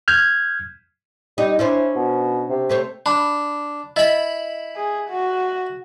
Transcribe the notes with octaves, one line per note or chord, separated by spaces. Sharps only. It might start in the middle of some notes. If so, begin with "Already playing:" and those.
F6 G6 G#6
G3 D#4
C#4 D4 E4 C5
B2
C3
A3 C5 C#5
D4 B5
E4 D#5 B5
G#4
F#4